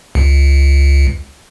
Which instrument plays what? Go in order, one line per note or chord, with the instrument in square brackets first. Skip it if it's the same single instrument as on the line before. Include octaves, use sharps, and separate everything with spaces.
[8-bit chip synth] C#2